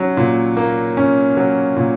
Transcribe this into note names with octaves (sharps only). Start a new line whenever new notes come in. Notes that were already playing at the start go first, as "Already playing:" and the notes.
Already playing: F#3 C#4
A#2
A#3
C#4
F#3
A#2